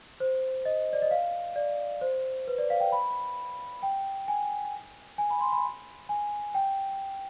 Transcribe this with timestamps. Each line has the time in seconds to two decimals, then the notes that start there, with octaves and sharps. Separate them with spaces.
0.20 C5
0.65 D#5
0.93 D5
1.02 D#5
1.11 F5
1.56 D5
2.01 C5
2.48 B4
2.58 D5
2.70 F5
2.80 G5
2.92 B5
3.83 G5
4.28 G#5
5.18 G#5
5.30 B5
5.41 C6
5.52 B5
6.09 G#5
6.54 G5